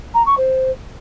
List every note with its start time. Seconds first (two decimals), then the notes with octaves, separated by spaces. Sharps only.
0.14 A#5
0.26 C#6
0.37 C5